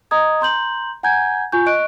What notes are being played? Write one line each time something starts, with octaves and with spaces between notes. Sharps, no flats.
D#5 A#5 D#6 G#6
A#5 C6 G6 F#7
F#5 G#5 A#5 G6 G#6
F4 G#5 C#6 G6
D#5 C#6 F#6 D7